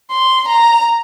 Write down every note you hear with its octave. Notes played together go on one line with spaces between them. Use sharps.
C6
A#5